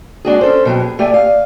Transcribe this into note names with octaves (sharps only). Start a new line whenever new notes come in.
G#3 D4 F#4 G#4
C#4 A4 C5
B2 F#3 G4
G#4
A3 G4 D5 G#5
F5